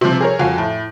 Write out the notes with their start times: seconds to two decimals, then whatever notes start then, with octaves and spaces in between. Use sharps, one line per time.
0.01 C3 F3
0.21 G#4 A#4 C#5
0.39 F2 F#4 F5 G#5
0.58 A2